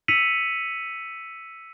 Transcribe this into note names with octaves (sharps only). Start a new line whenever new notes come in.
E6 B6 C#7 D#7 F7 F#7